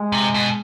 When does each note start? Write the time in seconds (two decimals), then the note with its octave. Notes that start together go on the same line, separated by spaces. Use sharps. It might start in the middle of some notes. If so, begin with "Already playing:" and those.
Already playing: G#3
0.12 C3
0.34 B2